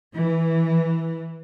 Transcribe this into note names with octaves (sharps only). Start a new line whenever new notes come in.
E3